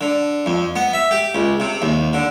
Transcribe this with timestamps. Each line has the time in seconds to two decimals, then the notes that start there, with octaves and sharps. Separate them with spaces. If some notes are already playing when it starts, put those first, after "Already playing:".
0.01 D3
0.46 F2
0.76 B3
0.93 E5
1.11 G4
1.35 C#2
1.60 C3
1.82 D#2
2.13 D3